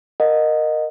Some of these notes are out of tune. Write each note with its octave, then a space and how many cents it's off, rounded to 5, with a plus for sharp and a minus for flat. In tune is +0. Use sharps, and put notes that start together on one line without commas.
A#4 +0 D#5 -10 F#5 -35